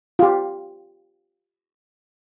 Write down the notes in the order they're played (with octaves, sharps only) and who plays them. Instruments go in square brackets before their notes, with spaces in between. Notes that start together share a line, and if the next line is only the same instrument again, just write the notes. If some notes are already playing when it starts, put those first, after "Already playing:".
[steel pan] F4 G4